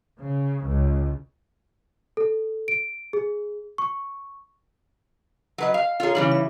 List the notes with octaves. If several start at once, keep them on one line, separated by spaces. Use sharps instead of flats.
C#3
C#2
A4
D7
G#4
C#6
F#3 B4 D#5
F5
F4 G#4 A4 C#5 A#5
C#3 E3 G3 D#4 C#5
E5